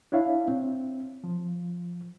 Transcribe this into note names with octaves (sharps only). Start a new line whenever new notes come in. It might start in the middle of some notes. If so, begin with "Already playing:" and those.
D4 E4 C#5 E5 F5
C4
F3